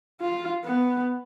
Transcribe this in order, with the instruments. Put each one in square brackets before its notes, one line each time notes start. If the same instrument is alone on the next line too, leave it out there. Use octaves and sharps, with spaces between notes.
[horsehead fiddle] F4
B3